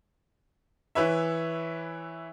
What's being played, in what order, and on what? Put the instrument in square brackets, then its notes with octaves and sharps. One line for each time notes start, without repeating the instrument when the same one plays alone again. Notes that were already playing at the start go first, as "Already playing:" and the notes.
[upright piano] E3 E4 B4 C#5 E5